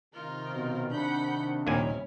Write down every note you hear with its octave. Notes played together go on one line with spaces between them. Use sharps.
C3 D#3 D#4 F4 A#4
B2
D4 F#5 B5 G6
D#2 A#2 G3 C#4 E4 G#5